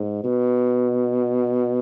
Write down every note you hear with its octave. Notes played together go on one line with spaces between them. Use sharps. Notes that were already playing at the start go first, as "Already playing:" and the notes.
Already playing: G#2
B2